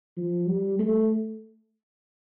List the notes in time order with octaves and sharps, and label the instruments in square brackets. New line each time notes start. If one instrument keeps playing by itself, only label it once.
[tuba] F3
G3
A3